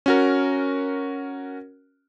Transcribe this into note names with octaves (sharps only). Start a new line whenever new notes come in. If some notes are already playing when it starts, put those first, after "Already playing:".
C#4 F#4 A#4